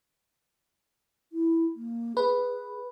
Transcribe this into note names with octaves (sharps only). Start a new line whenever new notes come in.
E4
A#3
G#4 B4